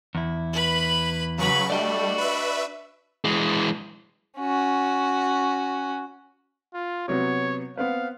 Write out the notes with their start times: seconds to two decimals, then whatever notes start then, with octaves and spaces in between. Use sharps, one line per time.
0.15 E2 E4
0.53 B4 B5
1.38 C#3 F#3 B4 B5 C#6
1.70 G3 A3 D4 F#4 D5 D#5
2.18 B4 E5
3.25 E3 G#3
4.38 C#4 F#4
6.73 F4
7.08 C3 F#3 B3 C#5
7.77 B3 C4 B4 F5